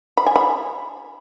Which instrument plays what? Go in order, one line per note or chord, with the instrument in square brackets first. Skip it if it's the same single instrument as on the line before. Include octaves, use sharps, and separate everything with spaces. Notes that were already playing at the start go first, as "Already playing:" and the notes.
[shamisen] B5
G#5
B5